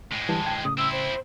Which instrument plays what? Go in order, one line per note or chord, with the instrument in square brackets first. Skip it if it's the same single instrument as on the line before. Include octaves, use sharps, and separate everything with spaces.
[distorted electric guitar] A2 G#3
[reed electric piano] D3 E3 G3 [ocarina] A5
[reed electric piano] D2 G5 G#6
[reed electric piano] A2 C#3 [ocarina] D#6
[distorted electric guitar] C4 E4 [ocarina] E6
[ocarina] C5